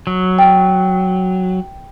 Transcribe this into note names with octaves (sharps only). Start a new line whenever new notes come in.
F#3
G5